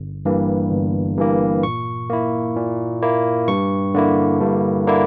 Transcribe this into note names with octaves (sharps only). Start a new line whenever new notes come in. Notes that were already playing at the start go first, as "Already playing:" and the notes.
Already playing: G1
G2 E3 A#3
G1
G2 E3 A#3
A#2 C#6
A#3 E4
A#2
A#3 E4
G2 C#6
D3 A#3 E4
G2
D3 A#3 E4